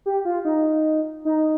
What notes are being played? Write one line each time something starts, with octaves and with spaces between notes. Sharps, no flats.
G4
F4
D#4
D#4